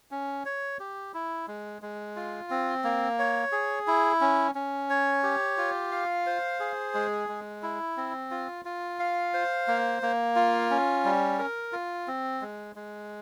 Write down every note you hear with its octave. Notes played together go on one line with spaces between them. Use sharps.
C#4
C#5
G4
E4
G#3
G#3
F4
C4
A#3
C#5
G#4
E4
C#4
C#4
C#5
G4
F4
F5
C5
G#4
G#3
G#3
E4
C4
F4
F4
F5
C5
A#3
A#3
F4
C#4
G3
A#4
F4
C4
G#3
G#3